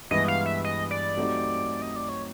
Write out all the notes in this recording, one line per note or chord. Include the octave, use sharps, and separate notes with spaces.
G2 E3 G#3 B3 D#5
F5
E5
D#5
D5
F#3 A3 C4 D#4 G4
D#5
D5
C#5